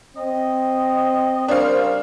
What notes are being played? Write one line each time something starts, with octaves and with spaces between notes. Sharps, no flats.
C4 D#5
C#3 G3 D4 A#4 C5 F5